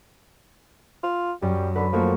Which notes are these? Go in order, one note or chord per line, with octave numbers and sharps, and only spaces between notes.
F4
F#2 G3
D3 B4
F3 A3 A#3 F#4